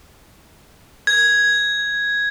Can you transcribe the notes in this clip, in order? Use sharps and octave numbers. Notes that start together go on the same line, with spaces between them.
G#6